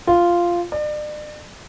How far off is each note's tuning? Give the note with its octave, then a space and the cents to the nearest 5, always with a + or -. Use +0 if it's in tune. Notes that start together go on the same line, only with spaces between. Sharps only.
F4 -5
D5 +40